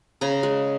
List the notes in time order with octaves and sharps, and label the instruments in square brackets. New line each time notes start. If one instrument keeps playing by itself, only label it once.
[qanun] C#3 A#5
G#3